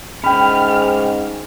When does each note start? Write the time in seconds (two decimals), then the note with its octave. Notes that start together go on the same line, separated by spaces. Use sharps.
0.24 G#2 C#4 E5 G5 B5 F6